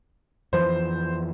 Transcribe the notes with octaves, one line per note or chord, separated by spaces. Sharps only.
F2 E3 F3 C5